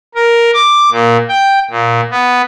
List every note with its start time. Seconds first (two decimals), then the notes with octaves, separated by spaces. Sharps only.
0.15 A#4
0.54 D6
0.92 A#2
1.29 G5
1.71 A#2
2.10 B3